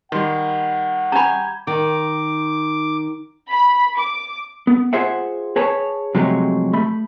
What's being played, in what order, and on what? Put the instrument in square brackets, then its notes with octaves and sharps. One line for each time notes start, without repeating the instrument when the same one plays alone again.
[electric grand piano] D#3 G3 [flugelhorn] F#5 [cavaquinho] C6
[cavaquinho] G4 G#5 [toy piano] A#5 B5
[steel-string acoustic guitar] D#3 [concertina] D6
[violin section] B5
D6
[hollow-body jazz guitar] B3
F4 G#4 C5 E5 F#5
G#4 B4 C#5 A5
C3 F3 F#3 G#3 A3 G4
A3 B5